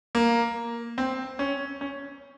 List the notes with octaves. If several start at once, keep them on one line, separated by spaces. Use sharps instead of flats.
A#3
C4
C#4
C#4